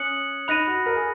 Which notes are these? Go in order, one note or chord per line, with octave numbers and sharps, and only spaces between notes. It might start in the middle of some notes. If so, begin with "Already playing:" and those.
Already playing: C#4 D#6 F#6 C#7 F#7
D#4 B5 F#6 A#6 D#7
F#4
A#4
G#4